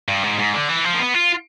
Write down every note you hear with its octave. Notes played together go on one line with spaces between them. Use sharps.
G2
G#2
G#2
D3
E3
F3
A#3
B3
F4